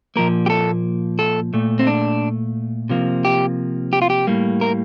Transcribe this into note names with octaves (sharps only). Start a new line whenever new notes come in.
A#2 F3 A#3 A#4
G4
A4
A4
A#2 A3
C4
D4
C3 F3 A#3
G4
G4
F4
G4
A2 G3 A#3
A#4